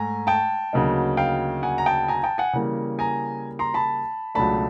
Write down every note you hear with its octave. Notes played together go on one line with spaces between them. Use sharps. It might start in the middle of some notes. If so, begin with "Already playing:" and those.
Already playing: G#2 A3 G#5 A#5
G5 A5
D2 C#3 F#3 A#3 D#4
F5 G5
F#5 G#5
A#5
G5 A5
G#5 A#5
G5 A5
F#5 G#5
C#3 E3 G3 A#3
G#5 A#5
A#5 C6
A5 B5
C#2 B2 F#3 A3 D4 A5 B5